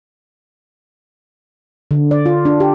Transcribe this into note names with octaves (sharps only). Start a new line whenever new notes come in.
D3
D5
F4
D4
G4